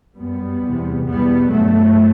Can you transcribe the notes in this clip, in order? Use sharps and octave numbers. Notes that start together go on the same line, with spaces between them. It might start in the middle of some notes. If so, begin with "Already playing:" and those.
F#2 G3 B3
E2 C3
E2 B2 G3 B3
G2 F#3 A3